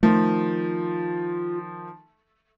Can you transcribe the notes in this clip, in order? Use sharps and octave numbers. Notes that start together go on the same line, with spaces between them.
D#3 F3 A3 F4